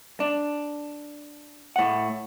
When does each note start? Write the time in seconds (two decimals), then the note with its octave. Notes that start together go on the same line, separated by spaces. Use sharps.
0.20 D4
1.76 A2 F#5